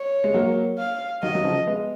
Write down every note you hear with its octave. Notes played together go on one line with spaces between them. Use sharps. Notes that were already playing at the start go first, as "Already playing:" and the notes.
Already playing: C#5
G#3
F#3 A#3
F5
D#3 F#3 D#5
F#3
C#3 F3
G#3 B3